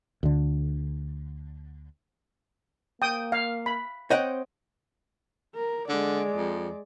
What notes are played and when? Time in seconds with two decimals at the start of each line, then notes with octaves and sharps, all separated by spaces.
0.23 D2 D3
3.02 A#3 G5 D#6
3.32 F5
3.66 B5
4.10 C4 C#5 D#5 F#5 G5
5.55 A#4
5.89 D3 G#3 D5
6.36 F2